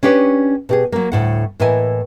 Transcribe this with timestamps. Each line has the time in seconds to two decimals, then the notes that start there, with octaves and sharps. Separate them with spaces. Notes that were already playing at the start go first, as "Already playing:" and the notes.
0.03 C#4 D4 G4 B4 C#5
0.69 B2 G4 G#4
0.92 F#3 A#3
1.12 D2 A2 F#5
1.60 A2 E3 A#3 E4 D#5 G#5